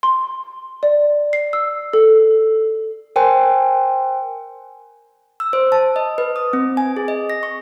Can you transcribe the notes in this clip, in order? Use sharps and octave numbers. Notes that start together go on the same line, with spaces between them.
C6
D5
C7
E6
A4
A#4 C5 G5 G#5 C6
E6
C5
A5
D#5
B4
D#6
C4
G#5
G#4
D#5
A#6
C#6